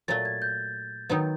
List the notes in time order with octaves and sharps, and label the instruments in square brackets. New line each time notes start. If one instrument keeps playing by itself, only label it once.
[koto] A#2 F#3 A3 [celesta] A6
[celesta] G#6
G6
[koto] D#3 F#3 B3 D#4